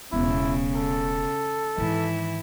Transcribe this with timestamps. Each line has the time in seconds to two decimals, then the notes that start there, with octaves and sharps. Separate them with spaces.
0.13 E1 C#3 B3 E4
0.76 A4
1.78 G#2 D#3 E3 E4